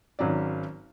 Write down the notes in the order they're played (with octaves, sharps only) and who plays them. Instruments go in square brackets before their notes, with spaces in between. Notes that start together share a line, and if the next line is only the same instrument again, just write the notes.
[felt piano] G#1 F#3 C#4 D5